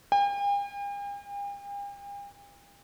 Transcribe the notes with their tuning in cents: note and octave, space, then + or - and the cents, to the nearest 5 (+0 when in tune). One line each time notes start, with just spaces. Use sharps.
G5 +45